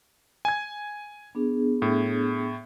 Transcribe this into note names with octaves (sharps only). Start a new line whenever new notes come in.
G#5 G#6
B3 D4 G#4
A2